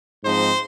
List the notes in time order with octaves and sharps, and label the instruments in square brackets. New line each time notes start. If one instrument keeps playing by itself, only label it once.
[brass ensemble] G#2 F3 G#3 C4 D#4 C5